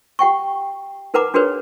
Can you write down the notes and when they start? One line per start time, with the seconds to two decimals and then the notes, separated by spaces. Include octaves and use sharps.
0.19 G4 F#5 G5 C#6
1.14 D#4 A#4 B4 F#5 A#5 D6
1.34 D4 F#4 G#4 A#4 B4 C#5